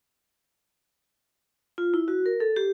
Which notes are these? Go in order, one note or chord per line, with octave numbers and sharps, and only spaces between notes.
F4
E4
F#4
A#4
A4
G4